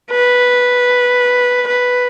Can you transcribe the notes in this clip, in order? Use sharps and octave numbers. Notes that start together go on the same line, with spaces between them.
B4
B4